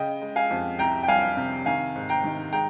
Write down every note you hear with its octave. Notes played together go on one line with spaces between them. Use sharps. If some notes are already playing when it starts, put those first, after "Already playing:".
Already playing: C#3 D#5 G5
G#3
F5 G#5
F2
C2 G5 A#5
G5
G3 F5 G#5
C3
D#3 F5 G#5
G#2
G5 A#5
D#3
G#3 G5 A#5